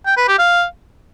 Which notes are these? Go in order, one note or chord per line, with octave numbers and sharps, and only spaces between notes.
G5
B4
G4
F5